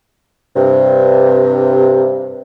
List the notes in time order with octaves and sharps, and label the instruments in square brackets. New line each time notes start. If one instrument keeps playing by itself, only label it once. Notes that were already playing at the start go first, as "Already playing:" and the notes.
[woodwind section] G2 C3